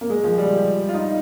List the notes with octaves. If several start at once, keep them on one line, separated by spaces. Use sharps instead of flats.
A#3
G#3
F3
G3
F4
D#4